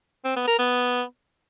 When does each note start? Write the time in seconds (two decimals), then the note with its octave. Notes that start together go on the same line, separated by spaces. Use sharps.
0.25 C4
0.36 B3
0.47 A#4
0.59 B3